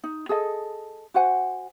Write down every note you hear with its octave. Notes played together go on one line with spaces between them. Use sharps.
D#4
G#4 A4 D#5
F#4 C5 F#5 G#5